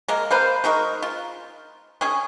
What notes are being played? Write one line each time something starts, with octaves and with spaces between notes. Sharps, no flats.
G#3 A#3 A#4
A#3 B4 C5 F5
G#3 D#4 F#4 A#4
F4
C#4 G#4